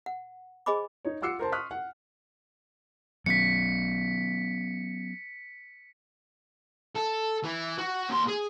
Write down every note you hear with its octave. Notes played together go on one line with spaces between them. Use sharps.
F#5
G#4 C5 D#5 G#5 B5 D6
D#4 C#5
F4 F#5 D6 E6 C7 C#7
A#4 C5 A5 C6
C6 C#6 D#6 F6 F#6 B6
F#5
F#3 B3 C#4 B6 C#7
A4
E3
F#4
D#2 C6
G#4